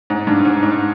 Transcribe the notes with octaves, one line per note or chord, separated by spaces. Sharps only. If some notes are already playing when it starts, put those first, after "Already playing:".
G#2
G2
G#2
G#2